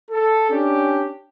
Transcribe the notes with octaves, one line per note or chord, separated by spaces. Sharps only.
A4
C#4 D4 G4